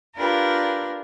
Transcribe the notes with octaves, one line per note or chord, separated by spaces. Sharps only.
D4 F4 G4 A#4 B4